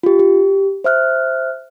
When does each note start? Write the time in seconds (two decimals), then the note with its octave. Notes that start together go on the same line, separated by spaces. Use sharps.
0.03 F4 G4
0.19 G4
0.84 C5 E5 F6 F#6